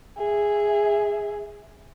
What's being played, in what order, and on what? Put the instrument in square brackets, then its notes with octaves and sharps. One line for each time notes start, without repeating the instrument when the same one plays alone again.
[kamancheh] G#4 E5